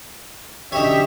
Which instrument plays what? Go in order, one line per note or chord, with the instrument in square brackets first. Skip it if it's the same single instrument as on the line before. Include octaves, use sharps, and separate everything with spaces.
[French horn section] D3 F#3 C#4 [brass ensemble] G4 E5 [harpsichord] C#5 D#5